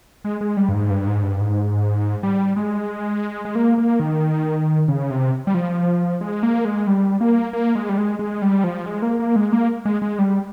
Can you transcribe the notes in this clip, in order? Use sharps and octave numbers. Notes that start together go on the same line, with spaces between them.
G#3
G#3
G3
G2
G#2
G2
G#2
G2
G#2
G3
G#3
G#3
A#3
A#3
D#3
C#3
C3
G3
F3
G#3
A#3
G#3
G3
A#3
A#3
G#3
G3
G#3
G#3
G3
F3
G#3
A#3
A#3
G#3
A#3
G#3
G#3
G3